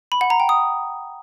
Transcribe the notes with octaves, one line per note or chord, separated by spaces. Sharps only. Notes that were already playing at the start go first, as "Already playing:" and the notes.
B5
F#5
A#5
G5
D#6